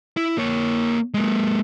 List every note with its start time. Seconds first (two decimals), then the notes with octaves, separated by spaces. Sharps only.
0.17 E4
0.38 A#3 C#5
1.14 G#3 A#3